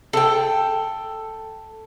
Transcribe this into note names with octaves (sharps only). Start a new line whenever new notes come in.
A4 G5